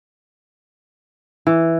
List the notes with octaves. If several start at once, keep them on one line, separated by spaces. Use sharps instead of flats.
E3